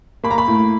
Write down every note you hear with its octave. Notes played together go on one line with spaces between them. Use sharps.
A#3 B5
A#5
B5
A2